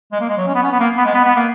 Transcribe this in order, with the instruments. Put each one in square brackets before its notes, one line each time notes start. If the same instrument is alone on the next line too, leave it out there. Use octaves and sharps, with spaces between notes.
[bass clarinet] G#3
A#3
G#3
F#3
C#4
B3
C#4
B3
A#3
B3
G#3
B3
B3
A#3